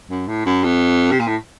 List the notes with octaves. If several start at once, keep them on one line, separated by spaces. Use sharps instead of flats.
F#2
A2
F#2
F2
C3
A#2
A2